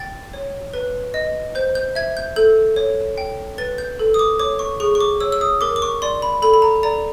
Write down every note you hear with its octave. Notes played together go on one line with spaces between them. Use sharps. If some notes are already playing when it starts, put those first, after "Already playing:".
Already playing: G5 A6
C#5
B4
D#5
C5 G6
G6
E5 G#6
G6
A4 G6
C#5
G5
B4 A6
G6
A4
D#6
D6
C#5 D6
C#6
G#4 C#6
C#6
D6
C#5 E6
E6
D#6
A#4 D6
D6
C#6
D5 C6
B5
A4 B5
B5
A#5
D5 A#5